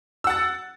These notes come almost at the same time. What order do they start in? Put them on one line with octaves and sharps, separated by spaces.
E6 F#5 A6